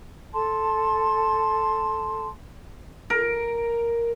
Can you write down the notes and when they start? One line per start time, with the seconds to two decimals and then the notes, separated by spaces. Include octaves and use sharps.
0.33 A4 A5 C6
3.10 A#4